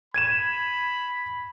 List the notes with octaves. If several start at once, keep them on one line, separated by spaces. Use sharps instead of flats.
B5 G#6 D#7 E7